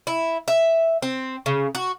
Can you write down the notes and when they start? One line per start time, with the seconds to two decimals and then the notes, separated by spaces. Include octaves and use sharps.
0.07 E4
0.48 E5
1.02 C4
1.46 C#3
1.75 F#4